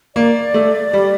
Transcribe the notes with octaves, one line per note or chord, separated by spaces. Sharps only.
A#3 D5
A3
G3